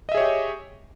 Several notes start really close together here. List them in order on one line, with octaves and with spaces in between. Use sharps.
D#5 E5 G#4 C#5 G4